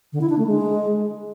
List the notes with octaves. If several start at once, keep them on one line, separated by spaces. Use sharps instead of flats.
D3
E4
D4
A3
G#3